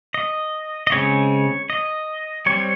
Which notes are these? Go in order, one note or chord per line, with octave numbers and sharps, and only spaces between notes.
D#5
D#5
C#3 G#3 C4 C#5
D#5
G3 C4 C#5